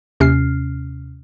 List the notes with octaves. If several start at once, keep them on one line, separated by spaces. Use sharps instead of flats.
D#2 C3 C#4 F6 C7